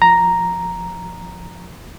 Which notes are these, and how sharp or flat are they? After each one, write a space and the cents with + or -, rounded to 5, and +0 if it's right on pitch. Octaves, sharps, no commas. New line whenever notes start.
F3 +0 A#5 +0